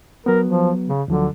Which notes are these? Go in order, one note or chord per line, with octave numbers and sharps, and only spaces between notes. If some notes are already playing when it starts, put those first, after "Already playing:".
F#3 B3 A#4
F3
C#3
D2 D3 F3 F#3